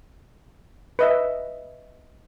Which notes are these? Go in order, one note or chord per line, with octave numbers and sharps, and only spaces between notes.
B4 D#5 E5